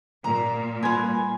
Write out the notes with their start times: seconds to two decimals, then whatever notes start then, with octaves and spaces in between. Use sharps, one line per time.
0.24 A#2 A#5
0.83 G3 F4 B4 G#5 C6